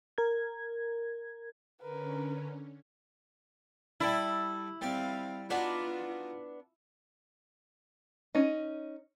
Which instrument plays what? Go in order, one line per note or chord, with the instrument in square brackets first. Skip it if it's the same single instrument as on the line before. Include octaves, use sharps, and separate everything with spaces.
[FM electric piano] A#4 G#6
[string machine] D3 C#4 [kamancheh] A#4 B4
[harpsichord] G3 A4 D5 [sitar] E4
[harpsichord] G3 G4 D5 [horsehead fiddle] C4 F5
[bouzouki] B3 D4 B4 [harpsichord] D#4 F#4 F5 [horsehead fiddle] F4
[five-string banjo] C#4 D#4